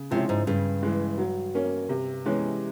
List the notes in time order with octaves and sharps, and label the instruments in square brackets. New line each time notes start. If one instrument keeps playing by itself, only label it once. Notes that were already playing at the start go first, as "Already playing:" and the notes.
Already playing: [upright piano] C#3
[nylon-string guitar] C3 [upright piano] F3 G#3 C#4 E4
[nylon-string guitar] G#2
[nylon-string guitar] G2 [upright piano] C#3
[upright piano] E3 G#3
F#3
A#3 C#4
C3
E3 G#3 C#4